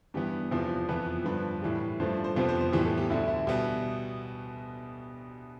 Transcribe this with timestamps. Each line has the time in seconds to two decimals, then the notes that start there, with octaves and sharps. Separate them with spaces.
0.14 G2 E3 B3 G4
0.51 E2 C3 F3 B3
0.89 F2 E3 B3 B4
1.25 G2 D3 F3 B4
1.62 A2 E3 G3
2.00 G2 F3 A3 C5
2.24 C5
2.36 F2 C3 F3 B3 C5
2.49 C5
2.61 C5
2.72 A2 E3 G3 B3 G4
2.85 A4
2.98 G4
3.10 D2 D3 G3 E4
3.28 E4
3.47 B2 G3 B3